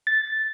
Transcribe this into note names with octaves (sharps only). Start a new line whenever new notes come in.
A6